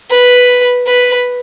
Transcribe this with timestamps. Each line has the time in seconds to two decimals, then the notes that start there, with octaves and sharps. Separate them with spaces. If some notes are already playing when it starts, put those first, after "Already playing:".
0.10 B4
0.87 B4